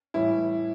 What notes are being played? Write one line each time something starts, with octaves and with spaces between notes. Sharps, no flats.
A2 E3 G3 E4